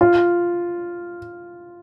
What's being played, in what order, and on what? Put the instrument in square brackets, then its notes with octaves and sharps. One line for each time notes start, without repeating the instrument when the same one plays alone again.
[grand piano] F4